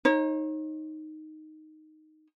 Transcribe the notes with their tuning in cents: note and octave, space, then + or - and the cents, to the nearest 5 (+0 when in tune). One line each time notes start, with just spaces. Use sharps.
D#4 +0 C#5 -40